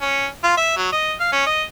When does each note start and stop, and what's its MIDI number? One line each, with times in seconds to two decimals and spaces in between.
0.01 0.27 61
0.43 0.55 65
0.57 0.74 76
0.77 0.92 54
0.92 1.13 75
1.20 1.32 77
1.32 1.46 61
1.46 1.63 75